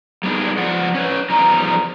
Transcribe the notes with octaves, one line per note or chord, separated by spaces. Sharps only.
G3 B3 D4 D#4 G#4
F3 F4 D5 F#5
C#4 B4
E2 F3 G3 D#4 A#5